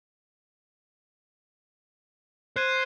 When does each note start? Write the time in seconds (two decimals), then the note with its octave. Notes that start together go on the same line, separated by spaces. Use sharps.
2.56 C5 F#6 G#6 D#7